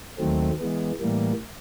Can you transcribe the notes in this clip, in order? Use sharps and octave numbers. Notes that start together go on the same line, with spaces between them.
D#2 D#3 F#3 A3 C4
E3 G#3 B3
A2 E3 G3 A#3